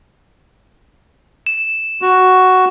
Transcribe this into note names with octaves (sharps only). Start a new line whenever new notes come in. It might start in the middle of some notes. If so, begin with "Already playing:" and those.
E7
F#4